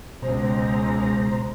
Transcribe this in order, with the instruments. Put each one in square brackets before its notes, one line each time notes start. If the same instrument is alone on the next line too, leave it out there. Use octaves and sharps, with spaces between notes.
[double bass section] C#2 G#3 [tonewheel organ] B2 C5 A#5